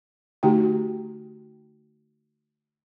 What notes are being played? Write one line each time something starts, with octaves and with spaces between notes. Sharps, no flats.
D3 A3 D#4 F#4 G4 G5